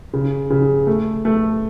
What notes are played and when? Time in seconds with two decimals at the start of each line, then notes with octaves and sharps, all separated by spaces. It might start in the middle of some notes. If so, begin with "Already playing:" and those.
0.13 C#3
0.50 C#3
0.87 A3
1.25 A3